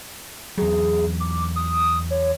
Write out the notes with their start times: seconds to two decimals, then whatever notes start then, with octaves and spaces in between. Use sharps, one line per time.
0.58 E2 F#3 G#4
1.20 D6
1.56 D#6
2.11 C#5